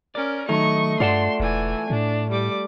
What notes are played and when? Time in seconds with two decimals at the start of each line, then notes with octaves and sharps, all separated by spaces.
0.15 C#4 A#4 D5
0.49 D#3 F#3 A3 D#4 D#5 C#6
1.00 G2 F4 D5 F#5 A5 C6
1.40 E1 E3 G#5
1.90 A2 D4
2.31 G3 D6